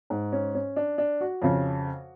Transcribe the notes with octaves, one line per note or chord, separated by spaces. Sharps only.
G#2
C#4
C#4
D4
D4
F#4
F2 C#3